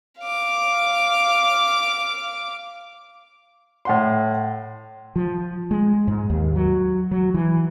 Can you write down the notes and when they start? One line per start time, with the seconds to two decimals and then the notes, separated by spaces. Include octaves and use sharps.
0.20 F5 D6
3.85 A2 F#5 C6
5.16 F3
5.71 G#3
6.07 G#2
6.30 D#2
6.56 F#3
7.11 F#3
7.34 E3